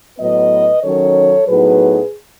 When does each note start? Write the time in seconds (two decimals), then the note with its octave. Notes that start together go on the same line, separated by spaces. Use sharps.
0.18 A2 F#3 B3 B4 D#5
0.83 D#3 F#3 C#4 A4 C#5
1.47 A2 F#3 B3 D#4 G#4 B4